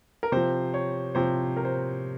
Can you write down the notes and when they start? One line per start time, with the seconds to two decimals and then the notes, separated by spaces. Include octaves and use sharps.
0.23 A#4
0.32 C3 F3 C5
0.74 C#5
1.15 C3 F3 C5
1.57 A#4
1.65 C5